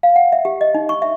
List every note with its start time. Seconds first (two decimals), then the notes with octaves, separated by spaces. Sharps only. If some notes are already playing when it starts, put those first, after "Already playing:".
0.03 F5
0.16 F#5
0.32 E5
0.45 G4
0.61 D#5
0.74 D#4
0.89 C#6
1.02 E5